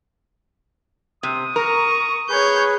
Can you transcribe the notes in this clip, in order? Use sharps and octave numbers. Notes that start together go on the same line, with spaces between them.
C3 D#6
A#4 A#5 C#6
G#4 B4 C#5 G6